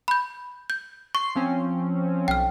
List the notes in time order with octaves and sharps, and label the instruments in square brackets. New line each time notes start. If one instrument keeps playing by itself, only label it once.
[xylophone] B5 G6
G6
[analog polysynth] C6 C7 [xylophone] C#6
[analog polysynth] F3 C4 C#4
[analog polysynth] B1 [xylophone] G5 F6